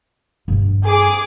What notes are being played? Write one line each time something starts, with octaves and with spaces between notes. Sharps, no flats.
G2 C4
G#4 D6